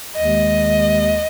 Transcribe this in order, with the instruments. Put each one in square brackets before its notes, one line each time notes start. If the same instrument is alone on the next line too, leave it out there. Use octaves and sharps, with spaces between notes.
[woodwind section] D#2 D#3 G#3 [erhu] D#5